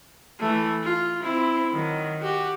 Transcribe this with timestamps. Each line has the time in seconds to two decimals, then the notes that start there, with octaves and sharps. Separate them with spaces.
0.39 E3 A3
0.83 F4
1.23 C4 E4
1.72 D#3 F#3
2.20 F#4 G4